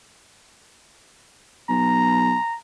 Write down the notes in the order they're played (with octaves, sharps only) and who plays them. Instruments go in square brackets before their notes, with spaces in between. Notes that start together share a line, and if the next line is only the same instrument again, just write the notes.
[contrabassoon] B1 [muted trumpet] A#5